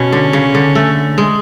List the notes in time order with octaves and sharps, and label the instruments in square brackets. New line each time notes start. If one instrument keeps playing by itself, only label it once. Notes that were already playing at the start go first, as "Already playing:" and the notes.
Already playing: [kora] B2 [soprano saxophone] C#4
[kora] D3
C#3
D3
A3
G#3